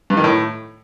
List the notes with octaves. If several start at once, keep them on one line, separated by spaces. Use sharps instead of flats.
G2
D#3
A2